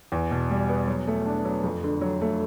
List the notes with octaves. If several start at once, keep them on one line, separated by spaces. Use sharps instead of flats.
E2
B2
G3
B3
F#3
A3
D4
F#3
F2
D3
F#3
A3